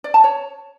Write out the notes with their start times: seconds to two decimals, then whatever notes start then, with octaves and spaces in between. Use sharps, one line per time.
0.04 D5
0.14 A5
0.24 C#5